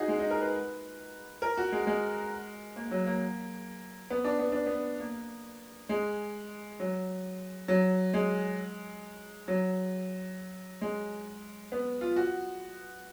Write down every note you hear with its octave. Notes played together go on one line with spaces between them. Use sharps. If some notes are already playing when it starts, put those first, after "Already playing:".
Already playing: D#4 F#4 G#4
G#3
D#4
A#4
B4
A#4
F#4
G#3
G#3
A#3
F#3
A#3
B3
D4
B3
D4
B3
A#3
G#3
F#3
F#3
G#3
F#3
G#3
B3
F4
F#4